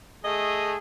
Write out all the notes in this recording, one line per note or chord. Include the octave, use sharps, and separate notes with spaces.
A3 G#4 D#5